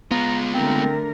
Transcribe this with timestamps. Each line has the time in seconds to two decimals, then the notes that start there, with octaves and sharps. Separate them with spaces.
0.11 G#3 B3 F4 A#5
0.54 D3 A3 C4 A#4